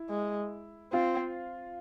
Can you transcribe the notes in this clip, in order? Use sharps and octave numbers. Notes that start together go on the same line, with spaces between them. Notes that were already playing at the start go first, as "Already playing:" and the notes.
Already playing: E4
G#3
C4 F4